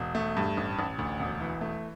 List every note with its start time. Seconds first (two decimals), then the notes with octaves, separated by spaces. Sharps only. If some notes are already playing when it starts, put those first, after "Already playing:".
Already playing: E1
0.15 A3
0.37 G2
0.57 A1
0.79 A1
0.98 D2
1.20 E1
1.40 E3
1.61 A3